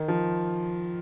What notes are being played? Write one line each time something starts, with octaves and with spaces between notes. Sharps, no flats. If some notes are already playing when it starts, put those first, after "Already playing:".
Already playing: D#3
F3